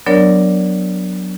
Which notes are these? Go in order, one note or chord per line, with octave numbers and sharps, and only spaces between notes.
F#3 B3 D4 A#4 C#5 D5